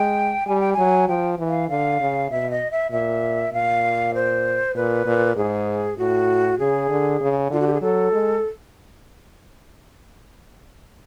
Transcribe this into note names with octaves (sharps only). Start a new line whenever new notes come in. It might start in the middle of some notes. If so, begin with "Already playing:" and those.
Already playing: G#3 G5
G3 G#5
G5
F#3 G#5
F3 G5
E3
F5
D3 F5
C#3
B2 E5
D#5
E5
A#2 E5
A#2 F5
C5
A#2 B4
A#2
G#2 G#4
A2 F#4
C#3 G#4
D3
C#3
D3 F4
F#4
G4
G#4
F#3 A4
G#3